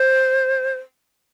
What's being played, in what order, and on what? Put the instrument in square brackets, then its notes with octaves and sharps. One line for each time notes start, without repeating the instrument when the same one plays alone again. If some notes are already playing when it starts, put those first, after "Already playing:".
Already playing: [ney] C5